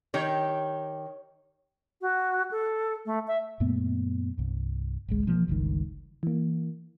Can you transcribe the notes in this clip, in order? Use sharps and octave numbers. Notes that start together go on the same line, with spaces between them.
D#3 G4 C#5
F#4
A4
A3
E5
F#2 A#2 A3 B3
C2 G2
G#1 C#2 G#3
B2 E3 F3 A#3
G1 C#2 G2 D#3
E3 A#3